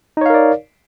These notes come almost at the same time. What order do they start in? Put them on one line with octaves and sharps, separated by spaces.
D#4 C#5 F5 A#4 D5